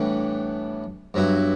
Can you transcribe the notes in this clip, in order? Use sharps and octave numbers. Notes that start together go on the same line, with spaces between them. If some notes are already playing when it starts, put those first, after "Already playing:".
Already playing: A2 E3 G3 B3 D4
G2 F#3 B3 E4